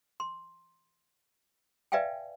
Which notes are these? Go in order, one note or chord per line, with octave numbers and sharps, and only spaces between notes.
C6
B4 D5 E5 F5 G5 G#5